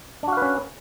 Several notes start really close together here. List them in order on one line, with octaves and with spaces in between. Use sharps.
D4 F#4 F5 B4 C#4